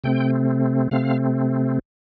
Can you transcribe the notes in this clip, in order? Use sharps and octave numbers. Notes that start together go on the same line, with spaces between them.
C3 A3 C4 G5
C3 A3 C4 F5